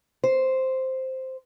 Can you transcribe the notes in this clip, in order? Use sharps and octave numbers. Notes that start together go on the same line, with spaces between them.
C5